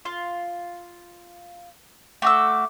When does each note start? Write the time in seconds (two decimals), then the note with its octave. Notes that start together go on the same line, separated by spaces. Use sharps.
0.05 F4
2.22 A3 F#4 D6 E6